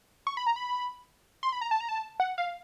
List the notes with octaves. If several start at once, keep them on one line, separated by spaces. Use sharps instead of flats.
C#6
B5
A#5
B5
C6
B5
A#5
A5
A#5
A5
F#5
F5